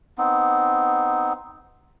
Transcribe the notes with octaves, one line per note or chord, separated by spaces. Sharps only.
B3 C4 D#4